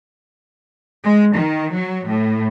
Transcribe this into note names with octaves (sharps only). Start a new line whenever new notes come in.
G#3
D#3
F#3
A2